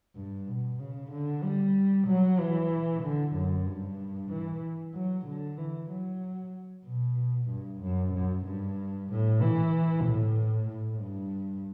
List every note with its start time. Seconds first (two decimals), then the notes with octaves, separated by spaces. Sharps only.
0.16 G2
0.48 B2
0.79 C#3
1.12 D3
1.44 G3
2.07 F#3
2.39 E3
3.03 D3
3.35 F#2
3.67 G2
4.31 E3
4.94 F#3
5.27 D3
5.59 E3
5.91 F#3
6.86 B2
7.50 G2
7.82 F#2
8.14 F#2
8.46 G2
9.10 A2
9.42 E3
10.05 A2
10.69 A2
11.01 G2